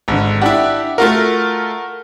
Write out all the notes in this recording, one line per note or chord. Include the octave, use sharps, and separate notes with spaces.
G#1 D3
D4 E4 G4 F#5
A3 F4 F#4 A#4